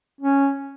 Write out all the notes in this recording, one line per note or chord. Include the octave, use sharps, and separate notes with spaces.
C#4